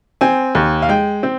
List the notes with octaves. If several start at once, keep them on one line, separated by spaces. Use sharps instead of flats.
C4 G#5
D#2
F5
G#3 G5
C4